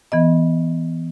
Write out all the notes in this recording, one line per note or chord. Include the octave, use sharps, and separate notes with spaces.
E3 B3 D#5